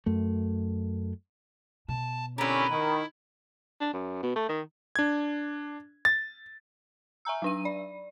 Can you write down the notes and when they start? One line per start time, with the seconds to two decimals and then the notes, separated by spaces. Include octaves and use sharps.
0.06 F#2 A3
1.88 B2 A5
2.38 D3 C4 C#4 E4 G4 A#4 B4
2.70 D#3 E4
3.80 D4
3.93 F#2
4.23 B2
4.36 A3
4.49 D#3
4.96 D4 G#6
6.05 A6
7.25 E5 G#5 A#5 E6
7.42 F#3 D4 D#7
7.65 D5